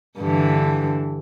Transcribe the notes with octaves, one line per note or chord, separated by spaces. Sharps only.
G2 D3 E3